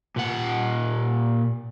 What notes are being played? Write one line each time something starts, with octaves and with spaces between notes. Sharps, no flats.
A#2 F#5